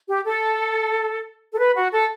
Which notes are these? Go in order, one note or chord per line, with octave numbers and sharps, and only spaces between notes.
G4
A4
A4
B4
F#4
A4